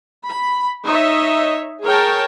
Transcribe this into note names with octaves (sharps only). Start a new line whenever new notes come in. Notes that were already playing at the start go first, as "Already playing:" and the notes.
B5
D#4 C#5 D#5 E5
G#4 A#4 C#5 G5 A5